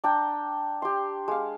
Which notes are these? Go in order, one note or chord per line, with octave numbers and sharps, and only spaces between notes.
D4 G5 A#5
G4 C6
G#3 F5